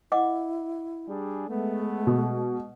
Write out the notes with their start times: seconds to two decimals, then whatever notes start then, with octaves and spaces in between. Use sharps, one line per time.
0.12 E4 D#5 F#5 D6
1.07 G3 D4 G#4
1.49 G#3 A3 B3
2.07 B2